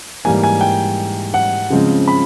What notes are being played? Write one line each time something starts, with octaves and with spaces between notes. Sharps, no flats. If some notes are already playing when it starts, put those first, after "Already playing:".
G#2 E3 G3 A#3 G#5
G#5
G5
F#5
C#3 F3 G#3 C4
B5